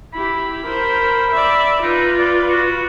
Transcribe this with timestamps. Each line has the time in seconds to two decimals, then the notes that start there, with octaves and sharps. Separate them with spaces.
0.14 E4 G4 B5
0.65 A#4 C5
1.32 D5 E5
1.82 D#4 F4 B4
2.17 D5
2.49 F#4